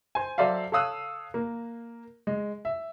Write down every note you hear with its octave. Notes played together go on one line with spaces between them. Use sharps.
C5 G#5
F#3 A4 C5 D5 E5 F5
A4 C#5 F5 D#6 E6 F#6
A#3
G#3
E5